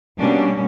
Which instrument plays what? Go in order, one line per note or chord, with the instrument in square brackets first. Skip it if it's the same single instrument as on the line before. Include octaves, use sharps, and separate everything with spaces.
[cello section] B2 G3 A#3 C#4 D4